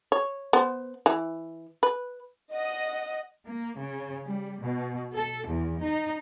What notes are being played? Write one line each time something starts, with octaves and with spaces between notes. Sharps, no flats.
C#5
B3 C5
E3
B4
D#5 F#5
A#3
C#3
G3
B2
A4
E2
D#4